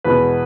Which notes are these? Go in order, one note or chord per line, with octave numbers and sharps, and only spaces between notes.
E2 B2 G#3 B4